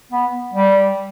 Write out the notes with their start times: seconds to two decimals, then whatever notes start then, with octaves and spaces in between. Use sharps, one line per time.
0.12 B3
0.54 G3